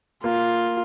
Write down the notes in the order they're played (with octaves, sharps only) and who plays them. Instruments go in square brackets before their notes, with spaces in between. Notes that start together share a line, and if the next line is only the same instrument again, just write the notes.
[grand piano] A#3 [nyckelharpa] F4